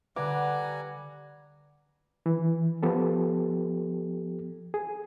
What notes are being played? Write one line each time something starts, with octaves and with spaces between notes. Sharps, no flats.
D3 G3 B4 F#5 G#5 A#5 D6
E3
F3 B3 G4 A4
G#4